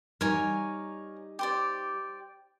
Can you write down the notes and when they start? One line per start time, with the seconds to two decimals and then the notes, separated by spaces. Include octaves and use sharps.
0.21 G3 D#4 A#4 C#5 G#5
1.39 G4 C5 D5